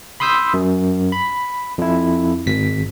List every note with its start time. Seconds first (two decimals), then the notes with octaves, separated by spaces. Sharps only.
0.20 B5 C6 D#6 E6 G6 B6
0.54 F#2
1.12 B5
1.78 F2 E4
2.46 G#1 B6